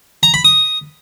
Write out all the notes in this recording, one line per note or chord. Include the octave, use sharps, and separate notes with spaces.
A#5
B5
D#6